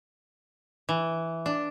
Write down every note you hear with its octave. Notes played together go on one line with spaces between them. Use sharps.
E3
D4